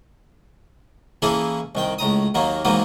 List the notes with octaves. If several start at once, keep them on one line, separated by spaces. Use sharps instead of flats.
E3 A#3 C#4 E4 G#4 A4
C2 D#3 G5
C#2 A2 A#5 D#6
D#2 D#3 F#3 A#3
G#2 D#3 E3 F#3 A#3 B3